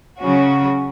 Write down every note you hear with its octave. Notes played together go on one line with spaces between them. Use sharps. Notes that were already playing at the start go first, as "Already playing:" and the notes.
C#3 F#3 C#4 F#4